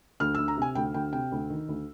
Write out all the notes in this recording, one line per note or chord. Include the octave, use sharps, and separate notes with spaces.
D2 F6
E6
D2
A#5
C3 G#5
D2 G5
D2 G5
C3 G5
D2
D#3
D2